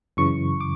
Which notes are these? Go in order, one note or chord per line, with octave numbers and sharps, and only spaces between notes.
F#2 C#3 E3 C#6
D6